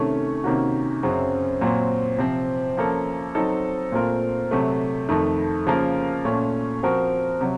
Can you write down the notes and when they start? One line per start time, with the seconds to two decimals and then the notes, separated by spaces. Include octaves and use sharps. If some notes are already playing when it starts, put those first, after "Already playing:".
Already playing: C3 D#3 A3 C#4
0.44 C3 D#3 A#3 C#4 F#4
1.03 F#2 C#3 F#3 C4
1.61 A#2 F#3 C4
2.18 C3 F3 C4
2.77 F3 A#3 C#4 A4
3.35 F#3 C4 D#4 A4
3.92 A#2 A3 C4 F4 A#4
4.51 C3 F#3 A3
5.09 F2 D#3 A3
5.66 C#3 F3 A#3 F4 A#4
6.25 A#2 A3 C#4
6.83 F3 C4 F#4 A#4
7.41 C3 F#3